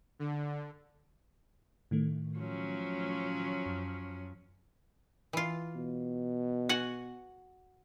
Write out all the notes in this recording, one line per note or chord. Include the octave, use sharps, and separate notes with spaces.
D3
A2 D#3 A3
F3 F#3 C#4
F#2
E3 F4
B2
F#4 F#5 G#5